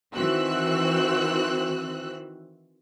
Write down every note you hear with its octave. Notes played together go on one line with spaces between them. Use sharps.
D#3 E3 C4 F#4 E6 F#6